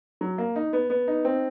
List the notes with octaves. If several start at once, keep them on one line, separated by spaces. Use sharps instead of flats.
F#3
A#3
D#4
B3
B3
D#4
C4